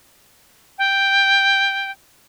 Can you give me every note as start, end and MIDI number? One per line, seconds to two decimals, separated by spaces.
0.78 1.91 79